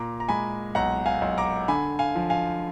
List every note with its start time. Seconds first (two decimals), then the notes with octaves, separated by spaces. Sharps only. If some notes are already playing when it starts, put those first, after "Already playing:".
Already playing: A#2 A#5 D6
0.20 A#5
0.28 G#3 G#5 B5
0.75 B1 F#5 A#5
1.06 F5 G#5
1.21 B1
1.38 A#5 D6
1.68 D3 G#5 B5
1.99 F5 G#5
2.15 F3
2.30 F5 G#5